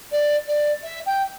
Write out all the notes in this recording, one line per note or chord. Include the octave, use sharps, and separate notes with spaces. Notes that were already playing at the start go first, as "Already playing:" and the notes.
D5
D5
E5
G5